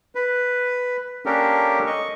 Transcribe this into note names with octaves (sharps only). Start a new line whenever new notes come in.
B4
A#3 C#4 D4 G4 A4 A#4
D#5 C#6